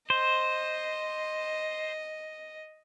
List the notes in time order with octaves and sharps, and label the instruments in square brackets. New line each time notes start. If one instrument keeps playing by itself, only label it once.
[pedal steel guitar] C5 [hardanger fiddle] D#5